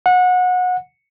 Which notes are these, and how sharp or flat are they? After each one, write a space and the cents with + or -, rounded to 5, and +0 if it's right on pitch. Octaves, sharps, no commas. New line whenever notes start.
F#5 -25